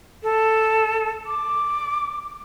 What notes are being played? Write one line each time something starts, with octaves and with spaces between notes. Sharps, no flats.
A4
D6